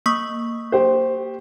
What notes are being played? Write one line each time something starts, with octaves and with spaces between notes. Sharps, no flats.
A#3 C#6 D#6
G4 C5